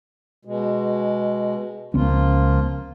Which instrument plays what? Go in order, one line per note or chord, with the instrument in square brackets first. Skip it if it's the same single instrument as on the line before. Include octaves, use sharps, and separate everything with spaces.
[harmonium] B2 G#3
[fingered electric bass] C#2 B3 C#4 [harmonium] F3 A#3 F4